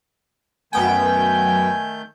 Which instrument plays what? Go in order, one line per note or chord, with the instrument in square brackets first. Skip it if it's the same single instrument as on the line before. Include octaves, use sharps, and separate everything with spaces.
[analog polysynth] F#2 B3 G5 [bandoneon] D#3 A3 G6 [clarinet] G#5